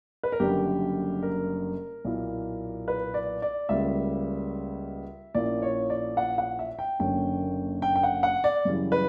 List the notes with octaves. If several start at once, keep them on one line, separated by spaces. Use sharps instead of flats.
B4
A#4
F#1 F#2 D3 G3 G4
A#4
B1 A#2 A#3 E4
B4
D5
D5
C#2 C#3 G3 A#3 E5
A#1 A#2 A#3 C#4 E4 D5
C#5
D5
F#5
F#5
E5
G5
F#1 F#2 D3 A#3 C#4 G5
G5
G5
F#5
F#5
D5
F#2 C#3 E3 G3
B4